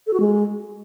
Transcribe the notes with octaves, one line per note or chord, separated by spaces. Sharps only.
A4
F#4
G#3